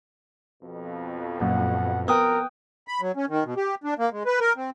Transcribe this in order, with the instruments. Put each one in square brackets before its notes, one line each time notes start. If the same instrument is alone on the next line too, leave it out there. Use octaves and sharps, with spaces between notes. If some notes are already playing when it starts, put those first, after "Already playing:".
[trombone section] F2 B2
[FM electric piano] F#2 A#2 [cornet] F#5
[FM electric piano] B3 [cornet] A#4 [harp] G5 D#6 F#6
[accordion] B5
F#3
C#4
D#3
B2
G4
D4
A#3
G#3
B4
A#4
C4